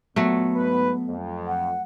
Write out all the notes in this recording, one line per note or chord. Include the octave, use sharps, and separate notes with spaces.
A#2 F#3 A3 B3
G#2 B4
F2
F#5